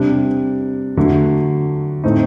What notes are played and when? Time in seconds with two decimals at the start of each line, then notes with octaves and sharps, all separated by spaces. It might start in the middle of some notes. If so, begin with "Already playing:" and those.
Already playing: C3 G3 D4
0.97 D3 F#3 A3
2.04 A2 A3 C4 D#4